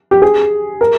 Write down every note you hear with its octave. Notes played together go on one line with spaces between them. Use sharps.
G4
G#4
A#4